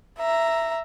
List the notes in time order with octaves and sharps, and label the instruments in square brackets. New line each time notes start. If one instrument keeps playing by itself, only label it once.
[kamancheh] E5 A#5